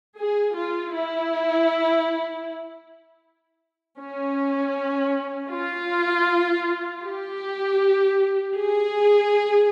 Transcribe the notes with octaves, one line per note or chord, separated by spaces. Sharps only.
G#4
F4
E4
C#4
F4
G4
G#4